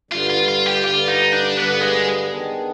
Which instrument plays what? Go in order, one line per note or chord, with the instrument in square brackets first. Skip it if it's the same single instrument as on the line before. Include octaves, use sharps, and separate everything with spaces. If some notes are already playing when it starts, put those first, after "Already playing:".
[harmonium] G2 D3 G3 [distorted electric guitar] F4
[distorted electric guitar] F4
F4
G4
[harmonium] G2 D3 G3 [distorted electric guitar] F4
[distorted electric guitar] D#4
D4
[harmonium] G2 D3 G3 [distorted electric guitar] B3
[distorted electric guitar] G#3
[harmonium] D#3 B3 D4 G#4